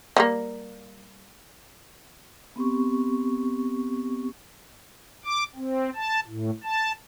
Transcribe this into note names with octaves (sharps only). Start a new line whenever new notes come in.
F3 G3 A#3
B3 C4 G4 C#6
D6
C4
A5
A2
A5